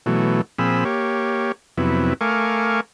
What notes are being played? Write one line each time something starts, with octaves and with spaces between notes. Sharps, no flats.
B2 E3 F#3 A3
A#2 F3 C4 G#4 B5 E6
A#3 G4 C#5
F2 C3 F#3 B3 E4
A3 A#4 F5 G#5 C#6 D6